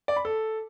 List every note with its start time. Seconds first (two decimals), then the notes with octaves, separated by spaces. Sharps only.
0.08 D5
0.16 B5
0.25 A4